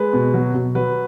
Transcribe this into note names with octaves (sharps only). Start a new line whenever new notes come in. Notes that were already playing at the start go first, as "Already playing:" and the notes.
Already playing: G#3 B4
B2
F#3
B2
F#3 B4